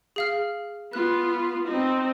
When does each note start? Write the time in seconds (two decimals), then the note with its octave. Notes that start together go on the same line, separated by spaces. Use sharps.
0.16 G#4 F5 F6
0.93 B3 F4 F#6
1.68 C4 D#4